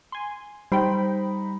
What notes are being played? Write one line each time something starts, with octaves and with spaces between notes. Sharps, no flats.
G#5 C6
G3 D#4 C5 G5 B5